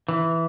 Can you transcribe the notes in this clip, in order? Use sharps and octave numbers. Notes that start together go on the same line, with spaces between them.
E3